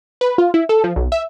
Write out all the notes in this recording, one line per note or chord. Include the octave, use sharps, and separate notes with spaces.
B4
F4
E4
A4
F3
B1
E5